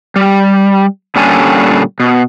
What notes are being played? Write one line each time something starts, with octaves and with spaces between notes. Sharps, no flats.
G3
A#2 D3 G3 C#4 A4 G#5
B2